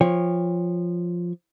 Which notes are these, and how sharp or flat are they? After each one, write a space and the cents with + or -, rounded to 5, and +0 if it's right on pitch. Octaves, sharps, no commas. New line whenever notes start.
F3 +0 C#5 +0 G5 +45